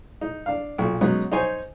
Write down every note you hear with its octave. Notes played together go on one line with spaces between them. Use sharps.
D#4
D4 F5
B1 A#2
F#3 G#3 B3 C#4 D#4
D#4 C5 C#5 G#5